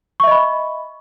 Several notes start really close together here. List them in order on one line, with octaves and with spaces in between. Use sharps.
C#6 E5 D#5 B5